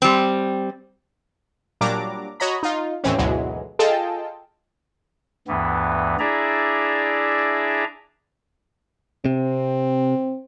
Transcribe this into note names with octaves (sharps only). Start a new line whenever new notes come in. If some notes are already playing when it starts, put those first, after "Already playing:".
G3 C4
A#2 F#3 G3 D4 A#5 D6
F#4 C#5 D#5 A#5 B5
D#4 F4
D#2 A2 E3 C4 C#4
G#1 D2 B2 E3 F#3 G#3
F4 G#4 A4 D#5 G5 A5
D2 G2 E3 B3
D4 E4 G#4 D5 E5 A#5
C3 C4